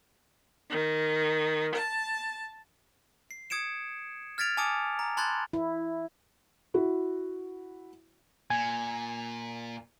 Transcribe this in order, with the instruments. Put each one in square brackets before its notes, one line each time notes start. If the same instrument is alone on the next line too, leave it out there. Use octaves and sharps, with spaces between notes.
[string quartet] D#3
A5
[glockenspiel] C7
D#6 G#6 C#7 D7 E7
F6 G#6 A6 B6 D7 F7
G#5 A5 D6 D#6 C#7 D7
A#5
A5 B5 C6 F#6 G#6 A6
[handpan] E4
[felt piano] E4 F#4
[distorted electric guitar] A#2 [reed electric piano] G#5